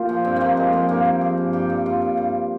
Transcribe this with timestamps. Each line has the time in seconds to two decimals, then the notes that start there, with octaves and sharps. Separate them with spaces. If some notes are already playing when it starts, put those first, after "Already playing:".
Already playing: A#2 F4 G4
0.09 F3
0.25 G2 C4
0.36 F3 A#3 C4
0.57 F3 G#3
0.73 F3 A#3
0.89 G2 A#3
1.05 G2
1.21 F3 G#4
1.38 G2
1.53 G2 G4
1.70 G2
1.86 G2 F4
2.02 G2
2.17 G2